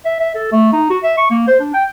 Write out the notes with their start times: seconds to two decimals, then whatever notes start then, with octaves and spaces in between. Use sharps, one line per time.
0.05 E5
0.20 E5
0.35 A4
0.52 A3
0.73 D#4
0.90 F#4
1.03 E5
1.17 C#6
1.30 A#3
1.47 C5
1.60 D4
1.74 G5